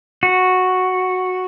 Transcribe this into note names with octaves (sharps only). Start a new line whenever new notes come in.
F#4